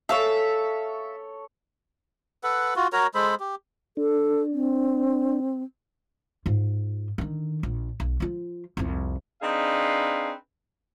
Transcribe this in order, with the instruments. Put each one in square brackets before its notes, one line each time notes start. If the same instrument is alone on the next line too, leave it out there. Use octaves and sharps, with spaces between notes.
[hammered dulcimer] A4 C#5 [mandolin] E5 F5
[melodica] A4 B4 F#5
F4 F#4
F#4 A#4 C#5 A#5
G#3 A4 C5 B5
G4
[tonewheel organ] D4 [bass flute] A4
[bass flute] C4
[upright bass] G#2 F4
D3 D#3
A#1
B1
F3 F4
C2 F2
[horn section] C4 D4 D#4 G#4 B4 F5